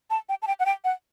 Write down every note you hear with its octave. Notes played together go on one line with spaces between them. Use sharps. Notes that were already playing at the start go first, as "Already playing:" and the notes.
A5
G5
A5
G5
F#5
G5
F#5